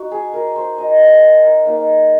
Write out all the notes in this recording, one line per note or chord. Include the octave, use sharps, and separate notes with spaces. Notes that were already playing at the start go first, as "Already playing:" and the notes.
Already playing: D#4 F#4
G#4
A#4
C5
D#5
F5
F#5
A#4
A#3 D#4